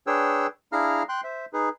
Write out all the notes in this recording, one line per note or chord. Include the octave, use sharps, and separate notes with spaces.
D4 G#4 B4 C#5 G5 E6
D4 E4 G#4 F5 A#5 F6
G5 C6 F#6
C5 E5
D#4 G#4 B4